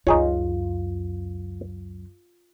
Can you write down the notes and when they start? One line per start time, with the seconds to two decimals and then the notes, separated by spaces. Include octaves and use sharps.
0.07 C#2 F#2 D#4 F4 G#4 C#5